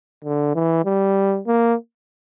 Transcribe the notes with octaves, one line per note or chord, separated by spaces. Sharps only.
D3
E3
G3
A#3